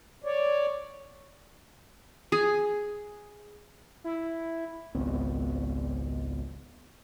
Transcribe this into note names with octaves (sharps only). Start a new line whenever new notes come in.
C#5 D5
G#4
E4
G#1 C#2 B3 C4